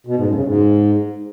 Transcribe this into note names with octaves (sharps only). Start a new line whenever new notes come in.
B2
G#2
F#2
C#3
G#2